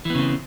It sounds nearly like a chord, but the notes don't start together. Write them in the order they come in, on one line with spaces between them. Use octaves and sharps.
E3 B3 C#3 C4